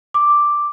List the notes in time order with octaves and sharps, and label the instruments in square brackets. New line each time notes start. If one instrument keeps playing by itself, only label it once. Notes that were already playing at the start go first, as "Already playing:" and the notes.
[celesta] D6